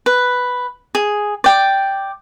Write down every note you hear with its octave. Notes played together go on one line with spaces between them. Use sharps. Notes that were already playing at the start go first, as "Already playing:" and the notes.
B4
G#4
D5 G5